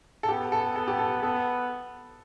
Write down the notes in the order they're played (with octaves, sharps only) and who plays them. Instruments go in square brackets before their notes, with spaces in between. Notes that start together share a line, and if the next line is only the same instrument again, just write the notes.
[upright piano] A4
[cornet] B3 [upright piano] G4
[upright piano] A4
[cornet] B3 [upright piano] A4
[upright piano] G4
A4
[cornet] B3 [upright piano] A4